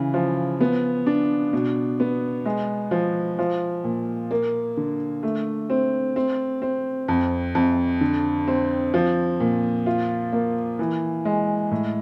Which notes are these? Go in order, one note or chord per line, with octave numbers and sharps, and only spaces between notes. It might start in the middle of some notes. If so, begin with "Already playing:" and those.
Already playing: C#3 E3
F3
B3
D4
B2
B3
G#3
F3
F3
A#2
A#3
D3
A3
C4
C4
C4
F2
F2
D3
C4
F3
A#2
F4
A#3
E3
G#3
A2